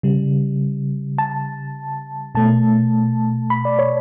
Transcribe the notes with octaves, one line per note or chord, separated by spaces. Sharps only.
C#3 G3
A5
B2 A3 A5
B5
D5
C#5